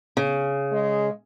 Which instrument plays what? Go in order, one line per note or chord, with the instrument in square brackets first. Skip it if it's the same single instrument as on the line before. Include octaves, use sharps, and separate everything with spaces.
[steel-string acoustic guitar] C#3
[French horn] G#3